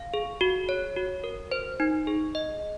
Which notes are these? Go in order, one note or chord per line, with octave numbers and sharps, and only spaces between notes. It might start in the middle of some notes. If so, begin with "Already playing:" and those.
Already playing: F5
G#4
F#4
C#5
F#4
A#4
C5
D#4
G#4
D#5